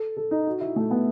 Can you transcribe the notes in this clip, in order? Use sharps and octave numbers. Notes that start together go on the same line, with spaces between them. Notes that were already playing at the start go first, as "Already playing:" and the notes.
Already playing: A4
A4
D#4
F#4
E4
A3
B3